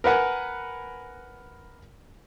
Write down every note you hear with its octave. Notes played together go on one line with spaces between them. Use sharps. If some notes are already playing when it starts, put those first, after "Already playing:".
A#4 B4 F#5 G#5